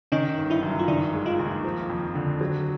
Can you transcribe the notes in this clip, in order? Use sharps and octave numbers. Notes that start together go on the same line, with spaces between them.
D#3 C#4 D#4
G1
D4 E4
F#2
F4
D#3 D4 E4
G#3
D#4 F4
D#2
F3
F2
D3
F#3